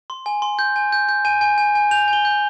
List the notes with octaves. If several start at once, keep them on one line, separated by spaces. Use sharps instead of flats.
C6
G#5
C6
G6
G#5
G6
G6
G#5 D#7
G#5
G#5
G#5
G6 F7
G#5
G7
G6